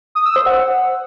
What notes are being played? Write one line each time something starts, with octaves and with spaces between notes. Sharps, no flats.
D#6
E6
C5
F#5